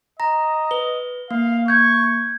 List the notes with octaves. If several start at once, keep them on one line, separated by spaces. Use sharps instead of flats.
D#5 A#5 A#6
B4 G7
A#3 F5
C#6 G6 G#6